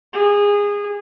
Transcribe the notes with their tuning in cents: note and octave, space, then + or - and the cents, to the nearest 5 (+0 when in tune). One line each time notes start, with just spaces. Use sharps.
G#4 -20